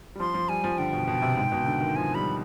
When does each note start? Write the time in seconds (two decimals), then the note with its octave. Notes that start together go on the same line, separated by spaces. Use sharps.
0.15 G3
0.20 F3 C6
0.34 F3
0.49 G3 G#5
0.64 F3
0.78 D3 G5
0.93 B2
1.08 B2
1.22 C3
1.37 G#2
1.52 B2
1.66 D3
1.80 D#3
1.96 F3 G#5
2.15 G3 B5